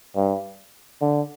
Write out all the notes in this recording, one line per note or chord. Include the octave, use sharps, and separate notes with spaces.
G2
D3